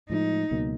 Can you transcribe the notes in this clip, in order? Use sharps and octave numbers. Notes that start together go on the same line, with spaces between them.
A2 F3 G#3 D#4
C#2 B2 F#3 A#3